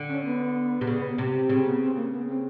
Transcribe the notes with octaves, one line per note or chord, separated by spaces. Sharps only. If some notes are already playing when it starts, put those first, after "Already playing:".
Already playing: D3
C#4
B3
C3
C#3
C3
C#3 C4
B3
C4
A#3
B3
C4